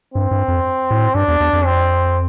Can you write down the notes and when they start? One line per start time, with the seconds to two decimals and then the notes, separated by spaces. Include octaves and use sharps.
0.14 G2 C4
0.31 G2
0.48 F2
0.91 A2
1.15 G2 D4
1.28 E2
1.40 E2
1.53 F2
1.65 C4